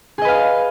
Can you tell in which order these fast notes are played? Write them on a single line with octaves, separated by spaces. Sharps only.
G#4 D#5 B4 F5